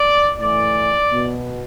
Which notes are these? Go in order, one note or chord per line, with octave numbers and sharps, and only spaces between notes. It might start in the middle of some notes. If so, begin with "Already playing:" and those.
Already playing: D5
A2 E3 D5
B2